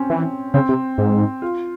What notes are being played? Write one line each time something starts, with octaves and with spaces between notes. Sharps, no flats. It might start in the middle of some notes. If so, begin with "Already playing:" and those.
Already playing: C4 C#4
E3
C#3 C4
C3
G#2
F4